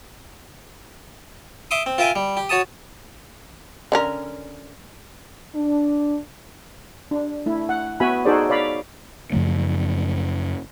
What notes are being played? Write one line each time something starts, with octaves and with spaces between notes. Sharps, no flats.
E5 C6 D6 D#6
C4
F4 A#4 E5 G5 G#5
G3
G4
F#4 C#5 A5 D#6
D3 C#4 A#4
D4
D4
A3 E4
F#5
B3 F#4 B4 E5 G#5 B5
D#4 F#4 G#4 A4 C5 D5
C#5 D5 F5 B5
F#2 C#3 F3 A3